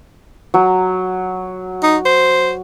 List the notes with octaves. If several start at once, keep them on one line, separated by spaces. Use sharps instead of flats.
F#3
D#4
C5